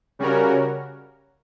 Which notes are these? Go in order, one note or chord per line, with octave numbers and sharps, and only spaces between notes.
C#3 G3 C#4 F#4 A#4